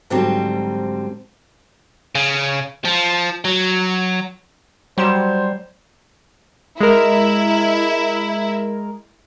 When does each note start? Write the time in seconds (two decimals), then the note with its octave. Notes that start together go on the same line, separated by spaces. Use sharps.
0.10 G#2 D3 F#3 G3 C4
2.15 C#3
2.85 F3
3.45 F#3
4.98 F#3 G3 C5 C6 E7
6.80 G#3 E4 A#4